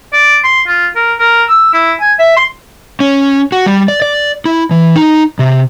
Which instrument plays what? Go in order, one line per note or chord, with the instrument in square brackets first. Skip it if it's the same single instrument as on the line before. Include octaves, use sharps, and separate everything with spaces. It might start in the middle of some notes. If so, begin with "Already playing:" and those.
[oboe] D5
C6
F4
A#4
A#4
E6
E4
G#5
E5
C6
[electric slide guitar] C#4
F#4
G3
D5
D5
E4
E3
D#4
C3